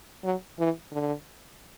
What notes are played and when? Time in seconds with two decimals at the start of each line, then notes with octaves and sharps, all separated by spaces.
0.24 F#3
0.59 E3
0.92 D3